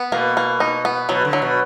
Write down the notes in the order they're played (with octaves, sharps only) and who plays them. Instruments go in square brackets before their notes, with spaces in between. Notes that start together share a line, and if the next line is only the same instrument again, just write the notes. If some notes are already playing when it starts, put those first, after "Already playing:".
Already playing: [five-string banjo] B3
[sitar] B2 [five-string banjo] A#3
[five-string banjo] A#3
D#4
B3
[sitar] B2 [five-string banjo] F#3
[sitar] D3
[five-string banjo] F#3
[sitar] B2